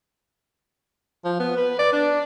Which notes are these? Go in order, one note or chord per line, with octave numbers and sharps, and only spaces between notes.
F3
B3
B4
D5
D4